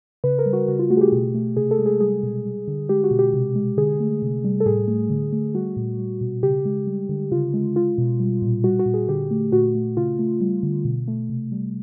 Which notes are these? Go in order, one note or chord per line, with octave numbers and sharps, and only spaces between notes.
C#3 B4
A#4
G3
F#4
C#3 F#4
F4
A3 F#4
G#4
G4
B2
A3
C3 G#4
A4
G#3
G#4
G3 G#4
B2
G3
D3
G#3 G4
F#4
B2
G4
C3
G#3
D3 G#4
A3
C3
G3
A4
A2 G#4
A3
D3
A3
G3 F#4
A#2
G3
B2
C#3 G4
G#3
G3
D3
C#3 F4
G#3
G#3 F4
B2
G3
A#2
G3 F#4
F#4
A#2
G#4
D3 G4
A3
A#2 F#4
A3
C#3 F4
A3
G3
D3
B2
A3
C3
G3